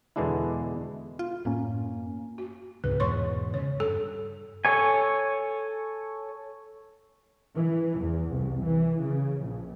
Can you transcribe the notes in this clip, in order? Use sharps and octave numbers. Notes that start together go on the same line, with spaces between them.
E2 B2 D3 G#3 D4 E4
F4
F#2 A2 A#3 C#4
F#4
C#2 G#2 C3 B4
E2 G#2 B2 C#5 C6 C#6
C#3 C#5
G2 A4
A4 C#5 G#5
E3
E2
C2
E3
C#3
A#1